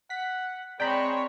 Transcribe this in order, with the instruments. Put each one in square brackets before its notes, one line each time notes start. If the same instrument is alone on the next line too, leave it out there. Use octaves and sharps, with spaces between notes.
[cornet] F#5 [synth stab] B6
[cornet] G#3 [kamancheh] C4 C#5 [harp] D5 A#5 [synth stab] G5 B5